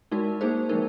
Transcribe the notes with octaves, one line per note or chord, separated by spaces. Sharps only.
G#3 D#4 F#4 A#4
A#3 D#4 G#4 C5
F3 G#3 D#4 A#4